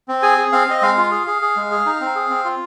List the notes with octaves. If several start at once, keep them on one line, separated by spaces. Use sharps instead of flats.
C4
G#4 G#5
G#4
C4 F5
C4 D#5
G#3 F5
F4
G#4
G#4
G#4
G#3
G#4
D#4
C4
G#4
C4
F4